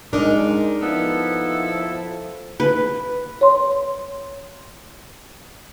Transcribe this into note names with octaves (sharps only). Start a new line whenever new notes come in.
G#3 D4 D#4 A#4
F3 B3 E4 A4
B4
C#5 C6